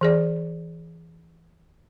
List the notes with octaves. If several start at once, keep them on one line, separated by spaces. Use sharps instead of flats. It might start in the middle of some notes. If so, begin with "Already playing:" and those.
E3 G#4 D5